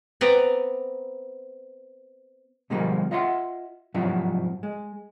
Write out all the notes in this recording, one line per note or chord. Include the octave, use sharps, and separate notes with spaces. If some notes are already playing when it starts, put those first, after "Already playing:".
B3 C4 B4 D5 A#5
B2 D3 F3 G3 G#3 A#3
F4 D#5 E5 F#5 C6
G#2 C3 F3 F#3 D4 E4
G#3